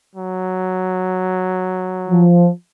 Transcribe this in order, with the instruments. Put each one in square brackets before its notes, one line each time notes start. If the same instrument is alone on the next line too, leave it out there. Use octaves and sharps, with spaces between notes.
[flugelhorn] F#3
[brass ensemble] F3